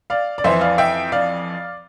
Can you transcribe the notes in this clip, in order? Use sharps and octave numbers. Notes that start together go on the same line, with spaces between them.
D5 F5
D5
F2 E3 C5 E5
D5 F5
E5 G5
D5 F5